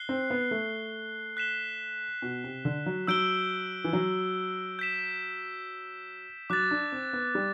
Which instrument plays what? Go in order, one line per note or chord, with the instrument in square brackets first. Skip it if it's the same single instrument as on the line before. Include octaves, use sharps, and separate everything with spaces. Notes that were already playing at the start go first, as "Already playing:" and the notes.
Already playing: [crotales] F#6 C7 G7
[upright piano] C4
B3
A3
[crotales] F#6 B6 E7 G7
[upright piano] B2
C3
D3
F#3
[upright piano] F#3 [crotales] E6 G6 D7 G7
[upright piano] E3
F#3
[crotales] G6 B6 E7
[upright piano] F#3 [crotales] D6 F#6 A6
[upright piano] D4
C4
B3
G3